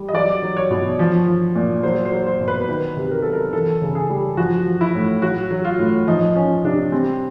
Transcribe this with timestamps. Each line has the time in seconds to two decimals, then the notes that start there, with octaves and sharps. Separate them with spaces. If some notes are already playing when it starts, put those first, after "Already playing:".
Already playing: G3
0.09 D#5
0.13 F#3 D5
0.43 F#3
0.57 C#5
0.71 B2
0.99 F3
1.27 F3
1.56 A#2
1.83 F#3 C5
2.05 C5
2.12 F#3
2.27 C5
2.41 B2
2.48 B4
2.68 D#3 B4
2.97 C3
3.11 A#4
3.22 F#3 A4
3.33 A#4
3.53 E3 A4
3.82 C#3
3.95 G#4
4.09 G3
4.37 F3 F#4
4.66 F3
4.81 E4
4.95 A2
5.22 F#3 F#4
5.51 F#3
5.65 F4
5.79 A2
6.07 F3 D#4
6.36 F3 C#4
6.64 C3 D4
6.92 G3 C4